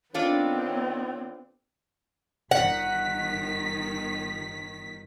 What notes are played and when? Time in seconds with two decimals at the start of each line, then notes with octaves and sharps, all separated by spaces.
0.14 D#3 B3 C4 D4 F4 A4 C#5
2.51 G1 D#3 F#5 B6